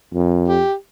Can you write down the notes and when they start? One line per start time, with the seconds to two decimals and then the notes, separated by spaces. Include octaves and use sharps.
0.14 F2
0.48 G4